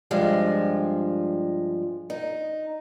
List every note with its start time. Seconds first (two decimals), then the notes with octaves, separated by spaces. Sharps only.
0.11 G2 F3 G#3
2.10 D#4